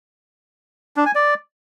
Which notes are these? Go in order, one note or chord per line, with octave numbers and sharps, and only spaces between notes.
D4
G#5
D5